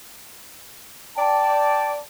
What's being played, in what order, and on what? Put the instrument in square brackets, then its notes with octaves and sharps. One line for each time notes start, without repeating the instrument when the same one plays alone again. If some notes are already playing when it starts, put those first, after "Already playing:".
[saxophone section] D5 [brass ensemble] G5 A5